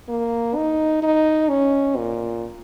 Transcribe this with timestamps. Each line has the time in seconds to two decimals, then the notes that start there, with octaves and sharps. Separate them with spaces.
0.09 A#3
0.56 D#4
1.03 D#4
1.49 C#4
1.97 A#2